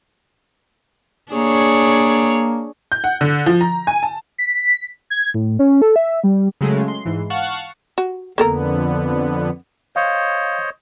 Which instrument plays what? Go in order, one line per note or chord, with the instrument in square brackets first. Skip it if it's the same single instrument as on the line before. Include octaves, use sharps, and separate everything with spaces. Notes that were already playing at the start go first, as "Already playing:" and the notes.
[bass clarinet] A#3 [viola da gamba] D4 G#4 C#5
[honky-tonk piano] G6
F#5
D3
F3
A#5
G#5
A5
[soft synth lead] B6
G#6
A2
C#4
A4
E5
G3
[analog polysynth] C#3 F#3 G#3 A3
C6
G#2 E3
F5 F#5 A5 C#6
[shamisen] F#4
[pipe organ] F2 D3 B3 [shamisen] A#3 A4 A#4
[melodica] C5 C#5 D#5 [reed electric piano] F5